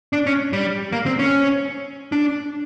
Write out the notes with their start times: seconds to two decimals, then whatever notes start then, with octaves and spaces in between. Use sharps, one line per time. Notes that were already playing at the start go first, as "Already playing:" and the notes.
0.13 D4
0.26 C#4
0.53 G3
0.92 A#3
1.06 C4
1.19 C#4
2.12 D4